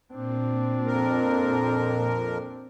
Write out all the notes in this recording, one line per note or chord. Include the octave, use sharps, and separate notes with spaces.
A#2 C4 D4
F2 A#4